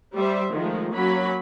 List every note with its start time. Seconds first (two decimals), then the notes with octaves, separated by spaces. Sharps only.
0.14 G3 C5 E5
0.53 D#3 F3 G#3 A3
0.92 F#3 A#3 C#4 B5